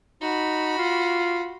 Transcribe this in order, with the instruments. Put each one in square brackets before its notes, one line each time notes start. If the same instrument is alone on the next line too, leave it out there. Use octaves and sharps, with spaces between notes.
[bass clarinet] D#4 [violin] F#4 B5
[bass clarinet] F4